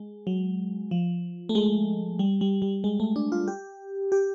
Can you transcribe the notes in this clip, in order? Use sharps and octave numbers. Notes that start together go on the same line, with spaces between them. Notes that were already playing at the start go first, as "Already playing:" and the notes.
Already playing: G#3
F#3
F3
A3
G#3
G3
G3
G3
G#3
A3
D4
F4
G4
G4